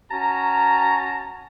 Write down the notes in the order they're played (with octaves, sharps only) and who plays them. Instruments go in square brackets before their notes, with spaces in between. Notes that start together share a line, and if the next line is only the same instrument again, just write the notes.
[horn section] C#4 F#4 A5 A#5